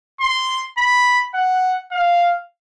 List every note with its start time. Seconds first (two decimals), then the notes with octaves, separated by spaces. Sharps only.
0.21 C6
0.78 B5
1.35 F#5
1.92 F5